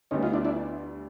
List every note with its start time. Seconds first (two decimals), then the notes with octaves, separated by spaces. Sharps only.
0.11 D2 D3 G3 B3 C#4 D#4
0.23 D#4 F4
0.33 D4 E4
0.45 D4 E4